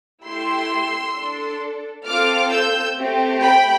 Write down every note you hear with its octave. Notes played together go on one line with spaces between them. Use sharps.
A3 E4 G4 C6 E6
D4 A4
C4 F4 A4 D6 F6
E6 G6
A3 C4 G4
G5 B5